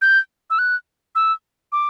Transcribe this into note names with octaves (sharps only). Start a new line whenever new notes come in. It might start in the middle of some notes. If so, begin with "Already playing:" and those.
G6
E6
F#6
E6
D6